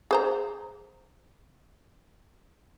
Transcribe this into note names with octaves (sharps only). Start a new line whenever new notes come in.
G#4 C5 A#5